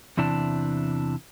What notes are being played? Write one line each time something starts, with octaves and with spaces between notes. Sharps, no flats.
E2 C3 E3 D4 A5